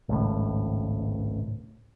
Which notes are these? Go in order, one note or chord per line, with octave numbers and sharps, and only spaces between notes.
G#1 C#2 A2